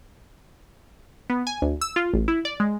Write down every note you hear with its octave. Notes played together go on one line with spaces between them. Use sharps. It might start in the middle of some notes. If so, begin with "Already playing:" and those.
B3
G#5
D2
E6
F4
A1
E4
D5
G#3